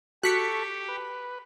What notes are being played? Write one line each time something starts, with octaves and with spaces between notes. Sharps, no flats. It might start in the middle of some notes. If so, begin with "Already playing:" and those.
F#4 G4 A4 C#6 F#6 B6 C#7
B4